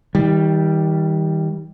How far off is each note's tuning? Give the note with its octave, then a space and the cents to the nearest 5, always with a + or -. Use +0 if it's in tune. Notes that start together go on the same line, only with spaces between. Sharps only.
D#3 +40 G3 +0